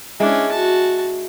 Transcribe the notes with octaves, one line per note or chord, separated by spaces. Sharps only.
G#3 C#4 D4 E4
F#4 A5